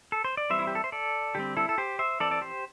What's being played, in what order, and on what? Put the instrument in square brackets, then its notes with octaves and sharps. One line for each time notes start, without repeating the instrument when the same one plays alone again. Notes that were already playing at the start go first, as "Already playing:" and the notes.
[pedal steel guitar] A4
C5
D5
E3 G3 C4 C5 E5
E4
G4
A4
C5
A4 D5
D3 G3 C4 G4
E4 A4
A4
G4 C5
C5 E5
E3 C4 A4 D5
D5
G4 C5